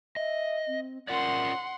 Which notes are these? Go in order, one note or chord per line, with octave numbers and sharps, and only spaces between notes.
D#5 E5
C4
C#4 F4 A#4 D5 F#5 C6